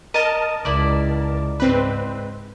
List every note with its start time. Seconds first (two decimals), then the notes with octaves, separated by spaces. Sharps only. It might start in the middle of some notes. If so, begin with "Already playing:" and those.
0.14 A#4 D#5 A5
0.65 C#2 E4 D5
1.60 G#2 C4 B4